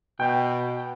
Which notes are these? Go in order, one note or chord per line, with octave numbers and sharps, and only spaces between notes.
B2 G5